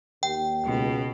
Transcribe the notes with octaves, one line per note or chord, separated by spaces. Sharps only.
D#2 G5
C#2 B2